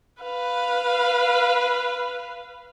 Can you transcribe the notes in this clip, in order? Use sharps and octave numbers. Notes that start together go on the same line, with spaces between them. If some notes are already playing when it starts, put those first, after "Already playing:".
B4 F5